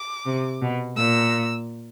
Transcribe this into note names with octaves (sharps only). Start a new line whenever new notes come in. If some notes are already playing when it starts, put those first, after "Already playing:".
Already playing: D6
C3
B2
A#2 E6